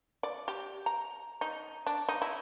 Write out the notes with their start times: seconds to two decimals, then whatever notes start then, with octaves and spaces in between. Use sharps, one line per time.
0.23 D5
0.48 G4
0.86 A#5
1.41 D#4
1.87 D4
2.09 D#4
2.22 E4